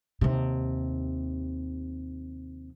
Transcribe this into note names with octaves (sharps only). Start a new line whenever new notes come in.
D#2 C3